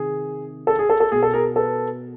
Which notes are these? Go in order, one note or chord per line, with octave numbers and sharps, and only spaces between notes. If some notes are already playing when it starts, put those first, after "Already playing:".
Already playing: C3 D#3 G#4
A4
G#4
A4
A4
B2 G#4
A4
G#4 A#4
A4 B4